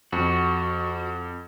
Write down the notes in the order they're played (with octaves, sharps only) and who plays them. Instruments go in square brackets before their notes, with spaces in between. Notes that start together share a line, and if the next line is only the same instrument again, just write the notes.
[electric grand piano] F2 F#5 [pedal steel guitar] F#4